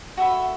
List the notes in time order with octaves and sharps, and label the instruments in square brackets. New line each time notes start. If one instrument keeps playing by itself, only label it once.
[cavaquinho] F#4 A4 E5 B5